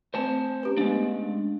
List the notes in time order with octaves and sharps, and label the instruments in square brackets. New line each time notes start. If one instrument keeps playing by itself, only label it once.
[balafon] A3 C4 [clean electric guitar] C5 G#5 A5
[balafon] C#4 G4 B4
[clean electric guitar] G#3 D4 [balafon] A3 B3